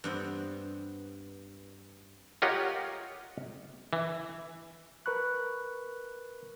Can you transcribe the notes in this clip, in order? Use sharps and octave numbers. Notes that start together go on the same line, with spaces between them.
G2 B3 C4
F4 G4 A#4 C#5 D#5 F#5
E3
A#4 B4 B5 C#6 F#6